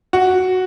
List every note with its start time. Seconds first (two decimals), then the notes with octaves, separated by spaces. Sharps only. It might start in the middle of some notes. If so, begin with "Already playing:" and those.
0.13 F#4